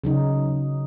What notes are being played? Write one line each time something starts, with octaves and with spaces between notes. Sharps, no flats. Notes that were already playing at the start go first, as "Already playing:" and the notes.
C#3 F#3 D#4